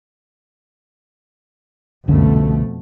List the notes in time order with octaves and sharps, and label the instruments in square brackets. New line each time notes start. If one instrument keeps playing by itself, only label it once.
[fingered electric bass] C2 D3 C#4 [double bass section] F2 B2 A3